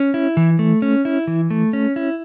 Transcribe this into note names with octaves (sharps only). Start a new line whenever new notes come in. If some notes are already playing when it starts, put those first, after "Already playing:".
Already playing: C#4
E4
E3
A3
C#4
E4
E3
A3
C#4
E4